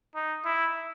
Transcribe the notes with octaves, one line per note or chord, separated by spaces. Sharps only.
D#4
E4